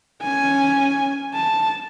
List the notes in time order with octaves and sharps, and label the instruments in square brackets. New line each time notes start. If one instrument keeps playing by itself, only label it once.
[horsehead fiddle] C#4 G#5
A5